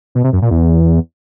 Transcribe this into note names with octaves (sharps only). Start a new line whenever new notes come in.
B2
C3
F#2
A#2
E2